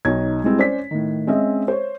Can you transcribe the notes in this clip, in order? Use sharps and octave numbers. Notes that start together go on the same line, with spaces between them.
B1 D#4 C#5 G#6
G3 G#3 C4 E4
C#4 C5 D5 B6
A2 D#3
G#3 C4 C#4 D#5 E5
C5 C#5